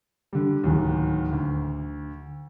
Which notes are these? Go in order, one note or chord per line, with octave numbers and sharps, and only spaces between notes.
D3 G3
D1 D#2
D2